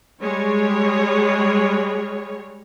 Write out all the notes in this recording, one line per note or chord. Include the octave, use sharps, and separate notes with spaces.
G3 G#3 C#5